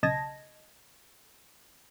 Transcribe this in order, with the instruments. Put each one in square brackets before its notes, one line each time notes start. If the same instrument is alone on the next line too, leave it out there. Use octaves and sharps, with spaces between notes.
[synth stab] B1 C#3 D#5 A5 G#6 A#6